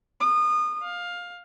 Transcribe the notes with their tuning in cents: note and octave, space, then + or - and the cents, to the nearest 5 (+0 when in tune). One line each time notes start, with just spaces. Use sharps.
D#6 -30
F5 +15